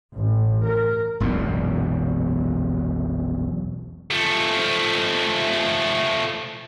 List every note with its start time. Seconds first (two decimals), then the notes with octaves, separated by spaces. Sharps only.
0.16 A1
0.63 A#4
1.20 E1 B1 F#2 A#2
4.11 F3 A3